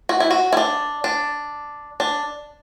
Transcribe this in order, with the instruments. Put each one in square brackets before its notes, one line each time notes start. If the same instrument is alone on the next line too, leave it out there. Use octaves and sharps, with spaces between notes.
[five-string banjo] F#4
E4
F#4
E4
D4
D4
D4